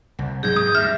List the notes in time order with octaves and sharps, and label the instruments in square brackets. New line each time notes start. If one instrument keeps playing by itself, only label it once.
[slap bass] C2
[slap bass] G#2 F#3 G#3 [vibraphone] G#4 [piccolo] G6
[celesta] D#6
[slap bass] D2 G2 [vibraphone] E5 [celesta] F6